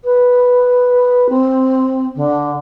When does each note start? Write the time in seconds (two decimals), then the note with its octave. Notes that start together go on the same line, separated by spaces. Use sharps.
0.04 B4
1.29 C4
2.15 D3